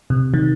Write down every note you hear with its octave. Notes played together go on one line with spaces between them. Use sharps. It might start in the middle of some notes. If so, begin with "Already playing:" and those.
C3
D#3